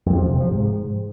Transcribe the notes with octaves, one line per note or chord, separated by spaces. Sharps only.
F2
F3
C3
F3
G#2